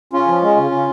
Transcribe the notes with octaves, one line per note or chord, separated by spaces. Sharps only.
C#3 C#4 F4
F3
G#3
C#3
C#3